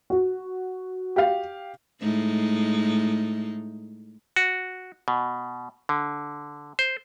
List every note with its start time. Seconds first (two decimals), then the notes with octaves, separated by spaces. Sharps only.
0.10 F#4
1.16 G4 F5
2.00 A2 G#3 D#4
4.36 F#4
5.08 B2
5.89 D3
6.79 C5